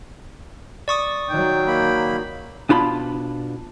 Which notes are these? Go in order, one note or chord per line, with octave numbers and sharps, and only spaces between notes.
D5 C#6 D#6
D#3 F#3 G5
A#3 B5
B2 D4 F4 B5